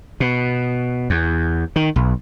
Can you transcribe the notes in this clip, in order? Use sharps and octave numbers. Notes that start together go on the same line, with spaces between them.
B2
E2
D#3
B1